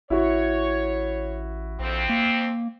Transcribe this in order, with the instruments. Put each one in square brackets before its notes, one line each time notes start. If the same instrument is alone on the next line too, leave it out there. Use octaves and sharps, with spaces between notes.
[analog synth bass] A1 [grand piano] E4 F#4 [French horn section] C#5
[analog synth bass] A#1 [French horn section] F2 C4
[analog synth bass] A#3